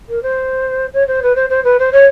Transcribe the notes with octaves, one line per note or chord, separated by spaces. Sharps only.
A#4
C5
C#5
C5
B4
C5
C5
B4
C5
C#5